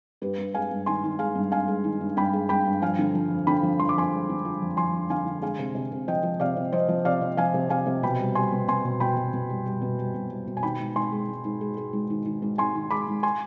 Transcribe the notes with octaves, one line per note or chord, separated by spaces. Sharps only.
G2 G4 B4
G2
G#3 F5 G#5
G2
D#3 G#5 C6
D#3
G#3 F5 G#5
G2
G2 F5 G#5
G#3
D#3
G2
G2 G5 B5
G#3
G2 G5 B5
G2
F3 F5 G#5
D3
F3
F2
D3 G5 B5
F3
F2 C6
D6
F2 G#5 C6
G#3
D3
F3
F2
F2 G#5 C6
D3
D3 F5 G#5
D3
G#3 F5 G#5
C3
C3
C3
F3 D#5 G5
F3
C3 D5 F5
C3
F3 C5 D#5
F3
C3 D5 F5
C3
F3 F5 G#5
C3
C3 F5 G#5
C3
B2 G5 B5
G3
G3 G#5 C6
B2
B2 G#5 C6
B2
B2 G5 B5
B2
B2
G3
G3
B2
G3
B2
G3
B2
G#5
D#3 G5 B5
G#2
G#2 G#5 C6
G#3
G#2
G#2
G#3
G#3
G#2
D#3
D#3
G#2
G#2 G#5 C6
D#3
G#3 B5 D6
G#2
G#5 C6